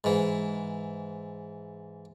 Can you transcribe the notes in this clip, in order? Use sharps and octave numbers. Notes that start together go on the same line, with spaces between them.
G#2 E3